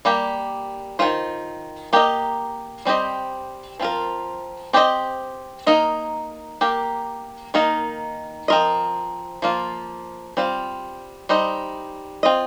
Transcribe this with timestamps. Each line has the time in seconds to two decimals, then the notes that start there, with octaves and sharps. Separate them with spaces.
0.05 G3 A#3 G4
0.99 D#3 C4 F4 C5
1.93 A#3 G4 A#4 D#5
2.85 G3 C4 G4 C5 D#5
3.80 F3 C4 F4 A#4
4.73 C4 G4 C5 D#5
5.66 A#3 D#4 A#4 D#5
6.61 A#3 G4 A#4
7.54 D#3 A#3 D#4 A#4 D#5
8.48 F3 C4 F4 A#4 D#5
9.42 F3 A#3 F4
10.37 G3 C4 F4 C5
11.29 G3 D#4 C5 D#5
12.23 C4 F4 D#5